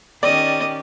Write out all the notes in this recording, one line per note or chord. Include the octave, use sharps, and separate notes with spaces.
D#3 C#4 G4 D5 D#5